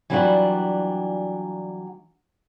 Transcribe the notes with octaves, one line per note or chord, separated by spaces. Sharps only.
E3 F#3 G3 D4 F4 F#4